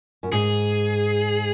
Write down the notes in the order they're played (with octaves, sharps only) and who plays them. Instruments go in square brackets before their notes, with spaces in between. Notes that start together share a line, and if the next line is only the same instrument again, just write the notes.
[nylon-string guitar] F#2
[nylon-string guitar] G#2 [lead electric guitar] G#4